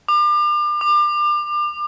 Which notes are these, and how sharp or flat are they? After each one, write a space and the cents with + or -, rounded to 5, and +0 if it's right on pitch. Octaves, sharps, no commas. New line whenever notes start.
D6 +35
D6 +30